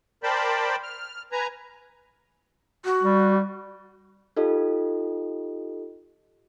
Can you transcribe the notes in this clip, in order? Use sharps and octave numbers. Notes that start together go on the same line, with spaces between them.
A#4 C5 D5 G5 A5 B5
F6
B4 G#5 A#5
F#4
G3
D#4 F4 G4 A4 D#5